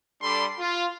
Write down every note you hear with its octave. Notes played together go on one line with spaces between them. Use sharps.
G3 D4 A4 B5 C6
F4